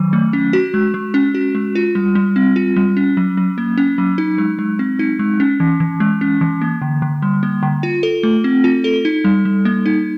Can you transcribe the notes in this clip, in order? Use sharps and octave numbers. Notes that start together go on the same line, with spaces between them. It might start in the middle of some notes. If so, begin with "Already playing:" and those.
Already playing: D#3 F#3
A3
C#4
F#4
G#3
G#3
C#4
F#4
G#3
F4
G3
G3
C4
F4
G3
C#4
F#3
F#3
A#3
C#4
F#3
D#4
G#3
G#3
C4
D#4
G#3
C#4
E3
E3
G#3
C#4
E3
A#3
D3
D3
G3
A#3
D3
F4
A4
A3
C4
F4
A4
D#4
G3
G3
A#3
D#4